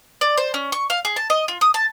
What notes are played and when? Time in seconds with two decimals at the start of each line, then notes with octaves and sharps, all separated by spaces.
0.21 D5
0.37 C5
0.54 C#4
0.72 C#6
0.90 F5
1.05 G#4
1.16 A5
1.30 D#5
1.48 F4
1.61 D#6
1.74 A5